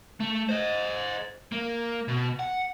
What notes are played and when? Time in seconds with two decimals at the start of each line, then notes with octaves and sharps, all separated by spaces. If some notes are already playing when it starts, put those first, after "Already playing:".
0.20 A3
0.49 C5 D#5
1.52 A#3
2.08 B2
2.39 F#5